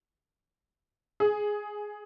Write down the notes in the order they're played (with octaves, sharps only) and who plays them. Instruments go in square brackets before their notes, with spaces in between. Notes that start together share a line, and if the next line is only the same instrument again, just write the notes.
[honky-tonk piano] G#4